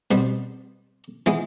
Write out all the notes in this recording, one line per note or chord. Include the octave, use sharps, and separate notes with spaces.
B2 G3 C4
E3 G#3 B3 E4